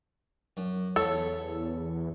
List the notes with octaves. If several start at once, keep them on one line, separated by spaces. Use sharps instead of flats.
F#2
E2 A4 C#5 B5